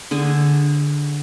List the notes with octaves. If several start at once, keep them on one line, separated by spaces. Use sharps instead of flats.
D3 G#4 G#5